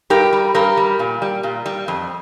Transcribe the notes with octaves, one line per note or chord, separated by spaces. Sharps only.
G2 G4 A#4
G3
G2 G4 A#4
G3
A#2
G3
A#2
G3
F2